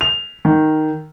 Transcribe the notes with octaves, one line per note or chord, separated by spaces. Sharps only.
F7
D#3